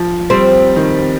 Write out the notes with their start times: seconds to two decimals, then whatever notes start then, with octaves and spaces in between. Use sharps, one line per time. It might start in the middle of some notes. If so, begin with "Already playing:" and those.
Already playing: F3
0.30 G3 C4
0.76 D#3